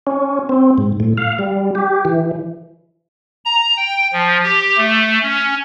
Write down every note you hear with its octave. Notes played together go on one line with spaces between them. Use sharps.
C#4
C4
G#2
A2
F5
G3
G4
E3
A#5
G5
F3
G4
A3
C#4